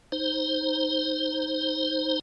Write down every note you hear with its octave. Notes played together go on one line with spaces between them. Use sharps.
D#4 C5